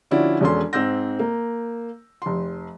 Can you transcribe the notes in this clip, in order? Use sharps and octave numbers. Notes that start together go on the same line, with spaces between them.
D3 F3 C#4 E4 F#4 D5
E1 E2 C#4 D4 A4 C6
G#2 C4 E6 G6 A#6
A#3
F1 C6